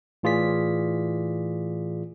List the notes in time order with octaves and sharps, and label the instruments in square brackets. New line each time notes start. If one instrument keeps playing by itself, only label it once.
[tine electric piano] A2 E3 F4 G#4 D5 B6